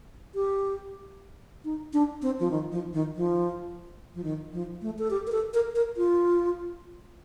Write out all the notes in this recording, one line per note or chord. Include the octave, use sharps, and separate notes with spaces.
G4
D#4
D4
C4
F3
D#3
F3
D#3
F3
F3
D#3
F3
A3
A4
G4
A#4
A4
A#4
A#4
F4